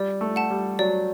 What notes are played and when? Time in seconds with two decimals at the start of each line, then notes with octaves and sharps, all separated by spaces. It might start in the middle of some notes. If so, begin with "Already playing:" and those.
Already playing: G3 D5
0.21 A3
0.36 F#5 A5
0.50 G3
0.79 F#3 D5